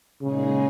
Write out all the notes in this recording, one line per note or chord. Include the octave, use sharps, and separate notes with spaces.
A#2 C#3 G#3 D#4 G#4